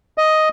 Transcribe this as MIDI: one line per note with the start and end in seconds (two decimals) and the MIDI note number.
0.18 0.49 75